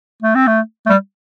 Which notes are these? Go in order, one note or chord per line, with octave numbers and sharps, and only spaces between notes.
A3
C4
A3
A3
G3